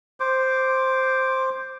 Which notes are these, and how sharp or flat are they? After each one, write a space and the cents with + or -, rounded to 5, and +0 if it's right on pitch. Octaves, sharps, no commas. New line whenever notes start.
C5 +0 D6 +0